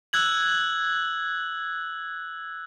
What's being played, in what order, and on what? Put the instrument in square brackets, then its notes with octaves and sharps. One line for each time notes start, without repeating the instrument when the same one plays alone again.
[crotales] E6 F#6 G#6 F#7